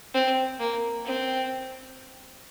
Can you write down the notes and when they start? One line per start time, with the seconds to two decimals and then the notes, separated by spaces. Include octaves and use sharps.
0.14 C4
0.60 A#3
1.05 C4